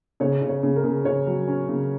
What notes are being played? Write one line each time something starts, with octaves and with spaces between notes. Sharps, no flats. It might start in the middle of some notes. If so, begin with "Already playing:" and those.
C#3 C#5
C#3
C#5
C#3
A#4
C#3
C#3 C#5
F#3
C#4
C#3